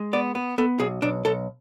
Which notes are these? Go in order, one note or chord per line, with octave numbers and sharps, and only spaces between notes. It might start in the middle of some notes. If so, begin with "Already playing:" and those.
Already playing: G#3
B3 D5
B3
B3 A4
B1 G#4
B1 D4
B1 A4